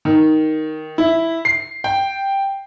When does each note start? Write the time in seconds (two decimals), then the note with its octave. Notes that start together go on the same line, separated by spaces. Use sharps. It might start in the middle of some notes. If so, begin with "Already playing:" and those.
0.05 D#3
0.98 E4
1.45 C7
1.84 G5